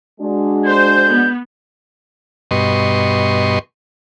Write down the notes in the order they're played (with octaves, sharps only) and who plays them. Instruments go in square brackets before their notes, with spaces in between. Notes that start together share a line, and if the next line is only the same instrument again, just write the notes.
[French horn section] G#3 D4 F#4
[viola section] C5 [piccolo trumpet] G6
[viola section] B3
[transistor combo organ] G2 B2 D#5 C6 C#6